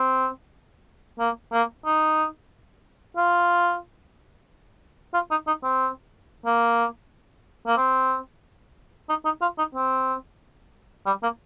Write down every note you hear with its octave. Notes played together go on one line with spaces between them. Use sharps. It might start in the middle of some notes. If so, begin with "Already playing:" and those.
Already playing: C4
A#3
A#3
D#4
F4
F4
D#4
D#4
C4
A#3
A#3
C4
D#4
D#4
F4
D#4
C4
G3
A#3